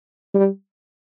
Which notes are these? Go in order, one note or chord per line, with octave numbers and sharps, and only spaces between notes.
G3